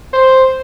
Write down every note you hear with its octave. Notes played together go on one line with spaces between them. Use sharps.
C5